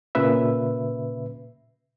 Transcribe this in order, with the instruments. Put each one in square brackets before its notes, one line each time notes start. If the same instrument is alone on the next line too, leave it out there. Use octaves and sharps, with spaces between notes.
[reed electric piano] A#2 C#3 B4 E5